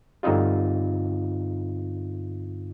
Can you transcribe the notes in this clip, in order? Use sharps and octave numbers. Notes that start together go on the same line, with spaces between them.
G2 D3 C4 D#4 F4